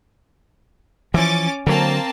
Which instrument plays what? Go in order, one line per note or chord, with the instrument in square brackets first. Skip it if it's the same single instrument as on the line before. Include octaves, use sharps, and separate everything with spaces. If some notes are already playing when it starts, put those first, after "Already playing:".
[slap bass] E3 F3 [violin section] C#4 D6 A6
[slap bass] D3 F#3 [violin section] A#3 C4 A5